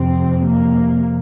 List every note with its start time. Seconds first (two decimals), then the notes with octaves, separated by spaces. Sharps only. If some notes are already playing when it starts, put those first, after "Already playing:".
Already playing: F2 C3 C4
0.47 A#3